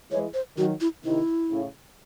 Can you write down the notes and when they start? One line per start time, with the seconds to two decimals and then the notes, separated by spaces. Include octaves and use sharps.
0.11 E3 G#3 C#5
0.34 C5
0.57 D#3 F#3 F#4
0.81 E4
1.04 C3 D#3 E4
1.51 A2 C#3